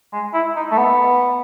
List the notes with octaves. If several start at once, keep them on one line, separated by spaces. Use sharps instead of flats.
G#3
E4
D#4
A3
B3